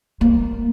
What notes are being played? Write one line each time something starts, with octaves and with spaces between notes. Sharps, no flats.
A#3